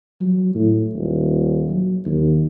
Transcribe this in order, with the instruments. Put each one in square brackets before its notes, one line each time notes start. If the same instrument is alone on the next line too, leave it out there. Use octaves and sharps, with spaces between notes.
[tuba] F#3
A2
D#1
F#3
D#2